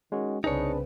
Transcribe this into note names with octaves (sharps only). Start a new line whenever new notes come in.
D#3 G#3 C#4 F#4
C2 C#3 C4 D4 D#4 G#4 B4 C#5